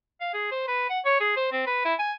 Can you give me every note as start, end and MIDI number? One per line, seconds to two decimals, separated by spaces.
0.21 0.32 77
0.34 0.49 68
0.52 0.65 72
0.68 0.86 71
0.90 1.00 78
1.05 1.19 73
1.20 1.32 68
1.37 1.48 72
1.52 1.64 60
1.67 1.81 71
1.85 1.94 64
1.99 2.12 80